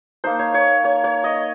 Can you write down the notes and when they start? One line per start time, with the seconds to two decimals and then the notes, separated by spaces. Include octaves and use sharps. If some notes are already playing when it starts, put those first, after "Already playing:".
0.24 A#3 D#4 C5
0.39 C#5
0.54 C#5
0.84 C#5
1.04 C#5
1.24 D#5